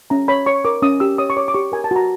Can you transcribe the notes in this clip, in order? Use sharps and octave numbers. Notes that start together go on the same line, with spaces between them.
C#4 A#5
C#5 B5
C#5 C#6
A#4 D6
C#4 D#6
G4 E6
C#5 D#6
C#6
C#5 D6
D6
G4 C#6
A#4 G#5
A5
F#4 A#5